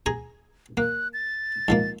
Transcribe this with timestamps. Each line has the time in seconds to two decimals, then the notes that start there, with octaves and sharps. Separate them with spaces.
0.06 G#4 G#5 A#5
0.77 A#3 F#6
1.13 A6
1.68 G#2 F3 A#3